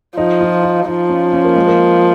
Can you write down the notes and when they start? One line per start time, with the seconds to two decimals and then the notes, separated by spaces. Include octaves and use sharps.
0.18 F3 D#4
0.41 F4
0.63 D#4
0.87 F3 D#4
1.09 C#4
1.33 C#4
1.44 A#3
1.56 G#3
1.67 A#3